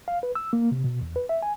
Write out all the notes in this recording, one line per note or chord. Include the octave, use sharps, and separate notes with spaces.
F5
B4
E6
A#3
C3
B2
E2
B4
E5
G#5